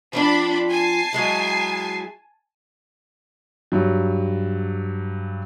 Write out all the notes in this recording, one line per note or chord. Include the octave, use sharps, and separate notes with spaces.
F3 C4 D4 F4 B5
G#5 A5 C7
F#3 G#3 E4
G2 F#3